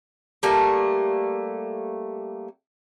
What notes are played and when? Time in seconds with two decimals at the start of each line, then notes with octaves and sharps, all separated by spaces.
0.43 G3 A3 A#3